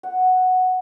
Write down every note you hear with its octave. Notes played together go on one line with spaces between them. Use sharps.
F#5